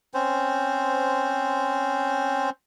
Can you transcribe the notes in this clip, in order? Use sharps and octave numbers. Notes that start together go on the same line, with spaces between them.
C4 C#4 C5